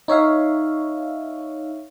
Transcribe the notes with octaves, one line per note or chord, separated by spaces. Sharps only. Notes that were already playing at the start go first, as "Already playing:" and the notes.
D#4 C#5 E5 F5